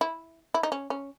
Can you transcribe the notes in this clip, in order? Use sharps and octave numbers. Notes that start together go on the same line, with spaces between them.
E4
E4
D#4
C#4
C#4